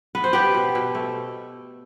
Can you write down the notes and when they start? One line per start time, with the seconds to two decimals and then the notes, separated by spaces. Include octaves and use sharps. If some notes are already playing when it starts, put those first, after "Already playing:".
0.15 B3 B4
0.24 C5
0.33 B3 G4 B4
0.54 B2
0.75 B2
0.95 A3